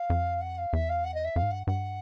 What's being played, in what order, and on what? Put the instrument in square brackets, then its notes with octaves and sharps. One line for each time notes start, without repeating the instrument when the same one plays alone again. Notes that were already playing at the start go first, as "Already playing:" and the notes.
Already playing: [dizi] F5
[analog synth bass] F2
[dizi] F#5
F5
[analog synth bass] E2 [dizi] E5
[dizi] F5
F#5
D#5
E5
[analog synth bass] F2 [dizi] F5
[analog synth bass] G#2
[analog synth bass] G2 [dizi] F#5
[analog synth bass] G2 [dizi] F#5